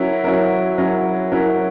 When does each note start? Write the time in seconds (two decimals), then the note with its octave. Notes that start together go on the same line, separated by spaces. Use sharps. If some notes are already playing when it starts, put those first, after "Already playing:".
Already playing: F#3 C#4 E4 A#4
0.24 F#3 C#4 E4 A#4
0.78 F#3 C#4 E4 A#4
1.32 F#3 C#4 E4 A#4